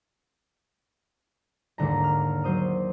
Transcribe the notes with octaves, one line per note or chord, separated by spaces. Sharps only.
D#2 G#2 D3 A#5
F6
F#3 C5 D#6